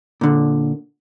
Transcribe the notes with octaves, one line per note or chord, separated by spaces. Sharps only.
A#2 D3